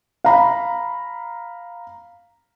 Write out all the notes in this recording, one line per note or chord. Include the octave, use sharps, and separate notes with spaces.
F5 A#5 B5